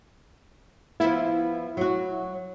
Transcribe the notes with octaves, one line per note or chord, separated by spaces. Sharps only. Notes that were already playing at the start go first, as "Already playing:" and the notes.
F3 B3 E4
F#3 F#4